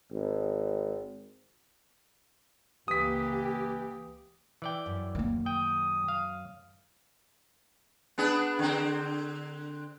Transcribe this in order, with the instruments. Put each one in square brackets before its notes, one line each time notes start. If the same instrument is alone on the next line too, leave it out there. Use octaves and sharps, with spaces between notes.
[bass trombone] G#1
[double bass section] C#2 A#3 [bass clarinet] E3 [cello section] G4 [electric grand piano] D#6 B6
[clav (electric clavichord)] E3 D5 G5
[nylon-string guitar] F#2
[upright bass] D#3 A#3
[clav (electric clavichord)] G5 [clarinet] D#6
[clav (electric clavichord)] F5
[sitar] B3 D4 G#4
D3 C4